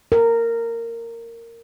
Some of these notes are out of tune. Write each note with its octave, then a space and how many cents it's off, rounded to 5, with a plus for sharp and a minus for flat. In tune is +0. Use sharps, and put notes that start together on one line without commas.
A#4 -15